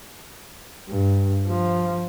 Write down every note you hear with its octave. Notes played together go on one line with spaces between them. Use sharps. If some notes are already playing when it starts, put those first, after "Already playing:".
G2
F3